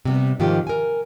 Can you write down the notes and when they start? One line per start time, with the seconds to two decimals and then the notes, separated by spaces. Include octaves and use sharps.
0.05 C3 G3 B3
0.40 G#2 D#3 F3 A#3 F4 G4
0.67 A#4 G#5